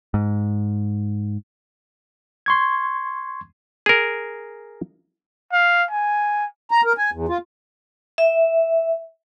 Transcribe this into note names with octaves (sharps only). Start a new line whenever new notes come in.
G#2
C6 C#6 G#6
G#4 A#4
F5
G#5
A#5
A#4
G#5
E2
F4
E5